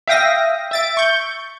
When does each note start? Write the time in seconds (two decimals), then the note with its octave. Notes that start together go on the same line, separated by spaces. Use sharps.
0.08 E5 F5 G5 D#6 A#6
0.71 E5 A6 D7
0.97 C#6 G6